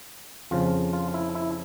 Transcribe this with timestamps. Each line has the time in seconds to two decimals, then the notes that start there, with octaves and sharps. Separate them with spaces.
0.51 F2 C#3 F3 F4
0.93 F4
1.14 E4
1.35 E4